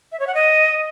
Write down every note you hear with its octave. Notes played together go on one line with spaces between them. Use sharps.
E5
C#5
F#5
D#5